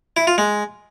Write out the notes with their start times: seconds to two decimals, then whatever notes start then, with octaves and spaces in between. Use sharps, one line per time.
0.17 E4
0.27 F4
0.38 G#3